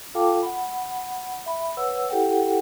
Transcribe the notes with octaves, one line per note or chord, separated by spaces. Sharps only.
F4 A4 F5 G5 A5 D6
F#5 B5
E5 B5
B4 C#5 F#5 E6
E4 G4 A4 F#5 G5